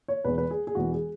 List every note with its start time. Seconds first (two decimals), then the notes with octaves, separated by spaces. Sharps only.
0.08 C#5
0.24 E1 E2 E3 B4
0.38 B4
0.51 G#4
0.67 G#4
0.75 E1 E2 E3 F#4
0.93 G#4